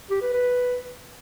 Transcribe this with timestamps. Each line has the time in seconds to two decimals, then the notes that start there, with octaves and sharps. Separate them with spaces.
0.11 G4
0.22 B4
0.33 B4